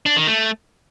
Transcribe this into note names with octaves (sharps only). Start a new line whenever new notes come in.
D4
D#3
A3